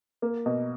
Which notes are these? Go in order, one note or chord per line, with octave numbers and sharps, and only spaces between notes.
A#3
B2